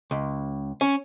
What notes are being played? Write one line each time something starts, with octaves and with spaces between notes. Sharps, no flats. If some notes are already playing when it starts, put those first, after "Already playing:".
C#2
C#4